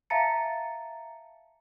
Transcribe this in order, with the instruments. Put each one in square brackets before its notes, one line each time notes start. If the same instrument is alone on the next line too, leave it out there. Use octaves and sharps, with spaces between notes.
[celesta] E5 F5 A5 A#5 A6 C#7